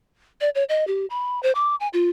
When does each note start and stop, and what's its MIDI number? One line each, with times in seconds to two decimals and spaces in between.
0.41 0.50 74
0.55 0.64 73
0.69 0.86 75
0.87 1.06 67
1.10 1.42 83
1.43 1.52 72
1.55 1.75 86
1.80 1.88 80
1.93 2.10 65